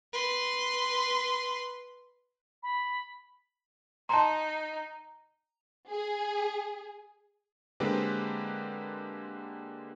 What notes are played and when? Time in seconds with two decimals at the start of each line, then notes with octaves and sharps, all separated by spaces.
0.13 B4 C6
2.63 B5
4.09 D#4 A5 A#5 C6
5.90 G#4
7.80 D3 G#3 A#3 C4 G4 B4